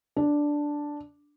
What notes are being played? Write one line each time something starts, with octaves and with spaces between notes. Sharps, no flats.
D4